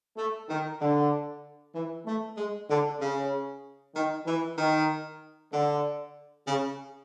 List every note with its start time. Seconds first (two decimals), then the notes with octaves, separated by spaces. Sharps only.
0.17 A3
0.48 D#3
0.80 D3
1.74 E3
2.06 A3
2.37 G#3
2.69 D3
3.00 C#3
3.94 D#3
4.26 E3
4.58 D#3
5.52 D3
6.46 C#3